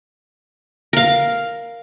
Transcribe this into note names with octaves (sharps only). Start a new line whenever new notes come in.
A#4 F5